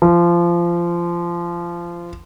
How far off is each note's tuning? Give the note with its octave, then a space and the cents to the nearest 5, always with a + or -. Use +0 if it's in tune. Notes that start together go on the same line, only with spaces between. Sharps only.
F3 -20